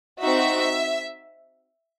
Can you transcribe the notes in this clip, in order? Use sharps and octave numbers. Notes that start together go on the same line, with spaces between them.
C4 D#4 F#4 E5